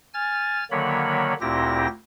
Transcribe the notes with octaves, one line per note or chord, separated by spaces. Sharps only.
G#5 F6 A6
D3 D#3 F#3 A#3 C#5 B5
D2 A#2 C4 E4 G4 A#6